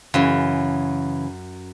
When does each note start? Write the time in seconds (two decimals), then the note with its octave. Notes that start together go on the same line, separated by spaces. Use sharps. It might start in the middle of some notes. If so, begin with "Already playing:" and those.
0.14 F#2 C#3 E3